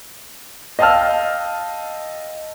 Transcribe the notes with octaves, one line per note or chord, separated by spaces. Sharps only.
D#5 F5 G5 A5 E6 F6